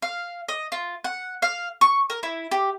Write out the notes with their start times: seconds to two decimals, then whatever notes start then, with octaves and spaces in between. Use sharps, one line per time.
0.02 F5
0.48 D#5
0.72 F4
1.04 F#5
1.42 F5
1.81 C#6
2.10 A#4
2.23 E4
2.51 G4